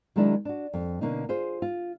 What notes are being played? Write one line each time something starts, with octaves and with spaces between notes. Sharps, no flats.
D#3 F#3 G#3 A#3 D4 E4
D4 F#4
F2
B2 D3 A#3 C#4 D#4
F4 G#4 C5
F4